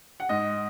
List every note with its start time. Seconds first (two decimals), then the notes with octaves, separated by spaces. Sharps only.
0.20 F#5
0.29 G#2 D#5